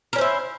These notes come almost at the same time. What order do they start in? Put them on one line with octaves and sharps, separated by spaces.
A#4 C#4 C5 E4